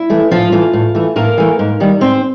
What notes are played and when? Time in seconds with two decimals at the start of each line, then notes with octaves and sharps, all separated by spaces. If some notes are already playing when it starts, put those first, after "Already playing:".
Already playing: E4
0.10 E3 A3
0.31 A2 F3 F4
0.52 E3 A3
0.73 A2
0.95 E3 A3
1.16 A2 A#3 A#4
1.38 E3 A3
1.59 G#2
1.80 D#3 G3
2.01 G#2 C4 C5